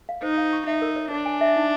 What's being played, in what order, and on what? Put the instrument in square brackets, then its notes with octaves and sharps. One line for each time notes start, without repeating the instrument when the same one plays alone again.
[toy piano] F5
[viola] D#4 [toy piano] C5
[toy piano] F5
C#6
[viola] D#4 [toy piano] E5
[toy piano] A#4
C#5
[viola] D4 [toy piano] C#5
[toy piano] G#5
E5
D#4